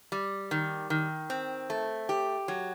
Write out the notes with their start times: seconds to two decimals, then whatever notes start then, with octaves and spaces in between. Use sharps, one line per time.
0.12 G3
0.51 D#3
0.90 D#3
1.30 C4
1.70 A3
2.09 G4
2.48 F#3